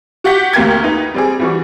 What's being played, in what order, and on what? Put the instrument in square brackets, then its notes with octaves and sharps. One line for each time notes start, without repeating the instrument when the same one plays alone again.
[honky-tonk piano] F#4 G4 F#5 G6 B6
D2 A#3 A#4 G5 G#6
D#4 B4
G3 C4 G#4
E3 G3 F#4